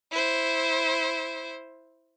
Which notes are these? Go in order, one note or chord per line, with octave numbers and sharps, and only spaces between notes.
E4 C5